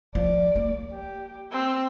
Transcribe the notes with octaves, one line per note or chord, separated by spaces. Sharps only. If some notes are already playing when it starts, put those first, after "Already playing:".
F3 D5
A#3
G4
C4 E6